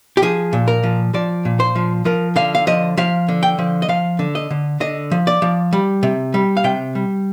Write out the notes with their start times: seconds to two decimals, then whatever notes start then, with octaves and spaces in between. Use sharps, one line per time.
0.17 G4
0.22 F3 G#4
0.53 A#2
0.68 A#4
0.83 F3
1.14 F3 D5
1.45 A#2
1.60 C5
1.75 F3
2.05 F3 A#4
2.36 D3 F5
2.55 F5
2.67 F3 D#5
2.97 F3 F5
3.28 D3
3.43 G5
3.59 F3
3.82 D#5
3.89 F3 F5
4.19 D3
4.35 D#5
4.51 D3
4.80 D3 D#5
5.11 F3
5.27 D5
5.42 F3
5.73 G3
6.03 C3
6.34 G3
6.57 F5
6.64 C3 G5
6.95 G3